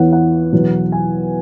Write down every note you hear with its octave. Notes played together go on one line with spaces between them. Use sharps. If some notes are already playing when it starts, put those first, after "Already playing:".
Already playing: E2 E3 B3 C#5 F#5
F#5
E2 B2 F#3 B3
G#5